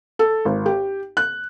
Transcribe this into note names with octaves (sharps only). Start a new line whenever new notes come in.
A4
G#1
G4
F#6